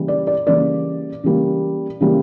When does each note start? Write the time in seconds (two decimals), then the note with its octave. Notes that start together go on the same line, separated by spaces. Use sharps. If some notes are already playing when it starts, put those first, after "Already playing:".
Already playing: C#3 E3 G3 A#3
0.08 D5
0.27 D5
0.47 C#3 E3 G3 A#3 D5
1.24 C#3 E3 G3 A#3
2.01 C#3 E3 G3 A#3